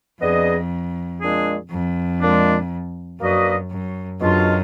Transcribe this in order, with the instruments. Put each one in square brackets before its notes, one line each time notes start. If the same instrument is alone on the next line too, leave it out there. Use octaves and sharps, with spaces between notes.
[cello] F2 [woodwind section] B3 D4 G#4 D#5
[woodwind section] A#2 G#3 D4 G#4
[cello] F2
[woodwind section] A#2 G#3 D4
[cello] F#2 [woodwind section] A#3 D4 F#4 B4 D#5
[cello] F#2
[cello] F#2 [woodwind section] B2 G#3 D4 F4